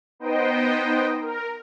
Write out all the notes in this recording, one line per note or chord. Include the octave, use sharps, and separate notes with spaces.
B3 D#4 C5 D#5 G5
A#4